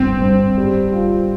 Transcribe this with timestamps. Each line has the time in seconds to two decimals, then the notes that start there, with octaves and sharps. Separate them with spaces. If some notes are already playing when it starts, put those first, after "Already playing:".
Already playing: G1 C4
0.22 G2
0.58 G3
0.93 F4